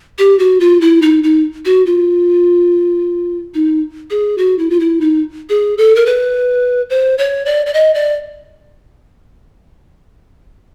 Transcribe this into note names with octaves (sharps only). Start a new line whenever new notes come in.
G4
F#4
F4
E4
D#4
D#4
F#4
F4
D#4
G#4
F#4
E4
F4
E4
D#4
G#4
A4
A#4
B4
C5
C#5
D5
D5
D#5
D5